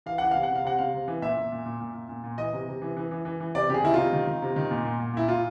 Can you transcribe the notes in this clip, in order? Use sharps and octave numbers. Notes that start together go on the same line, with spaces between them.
E3 F5
E3 F#5
C3 F5
F#5
C3
F5
C3 F#5
C3 F5
C3
E3
A#2 E5
A#2
A#2
A#2
A#2
A#2
A#2
A#2
E3 D#5
C3
C3
E3
E3
E3
E3
E3
C3 D5
C3 G4 G#4
D#3 E4
C3 F4
D#3
D#3
C3
D#3
A#2
A#2
A#2
A#2 E4
A#2 F4